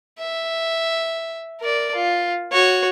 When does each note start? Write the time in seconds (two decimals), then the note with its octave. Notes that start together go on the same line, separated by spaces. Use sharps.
0.19 E5
1.61 A#4 D5
1.95 F4
2.52 F#4 C#5